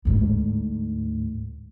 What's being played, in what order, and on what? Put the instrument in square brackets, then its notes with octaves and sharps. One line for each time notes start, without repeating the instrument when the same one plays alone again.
[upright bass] D2 G#2